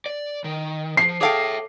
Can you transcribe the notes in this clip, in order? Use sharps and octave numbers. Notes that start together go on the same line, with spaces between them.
D5
D#3
F3 C7
G#4 A4 C#5 E5 F5 G5 D6